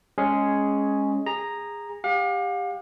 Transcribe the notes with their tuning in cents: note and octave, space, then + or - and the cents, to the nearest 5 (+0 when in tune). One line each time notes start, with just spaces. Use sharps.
G#3 +0 C#4 +0 G#4 +5
G#4 -20 A#5 +0
G4 +20 F5 +40